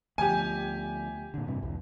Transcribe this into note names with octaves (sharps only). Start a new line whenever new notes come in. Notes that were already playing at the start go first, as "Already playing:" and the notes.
D2 F3 G4 G#5
A#2 D3
G2 C3
C2 F2